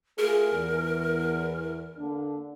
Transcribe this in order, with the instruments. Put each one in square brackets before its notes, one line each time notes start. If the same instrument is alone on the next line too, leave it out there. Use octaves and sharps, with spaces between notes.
[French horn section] A3 F4 G#4 [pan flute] A#4
[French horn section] E2
D3 A#3 D4